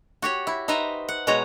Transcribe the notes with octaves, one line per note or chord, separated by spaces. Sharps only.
F#4 G4 C#5
E4
D#4 B4 C5 E5 A#5
F#5
B2 G#3 C#5 A#5